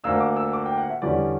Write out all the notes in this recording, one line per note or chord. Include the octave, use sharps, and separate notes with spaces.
D2 D3 A#3 D4 E6
D6
E6
D6
G5
F#5
E5
E2 D3 G3 C#4 D5